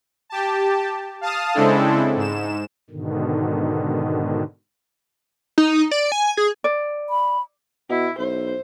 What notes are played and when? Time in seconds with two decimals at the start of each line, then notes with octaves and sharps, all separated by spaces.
0.30 G4 A5
1.21 F5 A5 D#6 F6
1.54 C#3 G#3 C4 D4 E4 A4
2.15 G#2 E7
2.90 G#2 B2 D3 D#3
5.58 D#4
5.91 D5
6.12 G#5
6.37 G#4
6.64 D5
7.10 B5
7.90 B2 E4
8.19 B1 C5